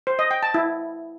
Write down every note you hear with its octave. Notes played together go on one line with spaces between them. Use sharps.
C5
D#5
G5
A5
E4